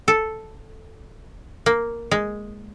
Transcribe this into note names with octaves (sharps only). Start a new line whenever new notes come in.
A4
A#3
G#3